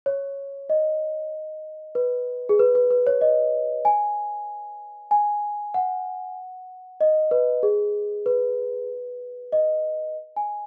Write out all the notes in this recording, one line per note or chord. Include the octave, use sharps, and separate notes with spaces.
C#5
D#5
B4
G#4
B4
B4
B4
C#5
D#5
G#5
G#5
F#5
D#5
B4
G#4
B4
D#5
G#5